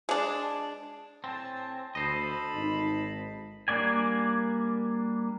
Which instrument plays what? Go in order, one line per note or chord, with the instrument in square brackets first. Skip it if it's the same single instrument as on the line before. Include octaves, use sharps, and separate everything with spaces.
[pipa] G#3 D4
[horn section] A2 G#5 A5 [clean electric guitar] C4
[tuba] D2 [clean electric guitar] A4 C5 D#5 [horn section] A5 B5
[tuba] G#1 [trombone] D#4
[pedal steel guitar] G3 A#3 D4 D5 G#5